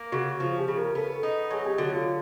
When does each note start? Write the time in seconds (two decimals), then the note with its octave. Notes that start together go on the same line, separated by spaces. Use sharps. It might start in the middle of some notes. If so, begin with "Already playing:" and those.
Already playing: A#3
0.12 C#3 F#4
0.40 F3 F4
0.58 G4
0.68 C#3
0.77 A#4
0.95 B3 A4
1.23 D#4
1.51 F#3 G#4
1.65 G4
1.78 D3 F#4
1.93 F4